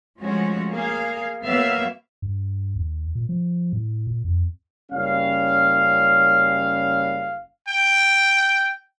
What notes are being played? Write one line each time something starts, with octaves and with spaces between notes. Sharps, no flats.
F3 G#3 A3 C#4 F#4
A#3 G#4 F5
F#3 A#3 B3 E5 F5
G2
D#2
A#2
F3
A2
A#2
F2
F#1 G3 C#4 F5
G5